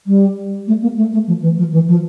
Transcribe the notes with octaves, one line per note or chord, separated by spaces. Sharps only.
G3
A3
A#3
A3
A3
F3
E3
F3
E3
F3